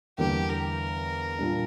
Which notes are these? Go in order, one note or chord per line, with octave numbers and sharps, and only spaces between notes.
E2 D3 G3 A#3 G4
A#4
A#2 G3 D4